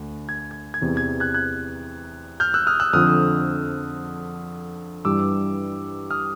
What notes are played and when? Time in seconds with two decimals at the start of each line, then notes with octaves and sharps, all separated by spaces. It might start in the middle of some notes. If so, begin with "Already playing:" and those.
Already playing: D2
0.29 G#6
0.51 G#6
0.74 G#6
0.81 E2 C3 E3
0.97 G#6
1.20 F#6 G#6
1.34 F#6 G#6
2.40 F6 G6
2.54 E6 F#6
2.67 D#6 F6
2.80 E6 F#6
2.93 F2 D3 F3 D#6 F6
5.05 G2 E3 G3 D6 E6
6.11 D#6 F6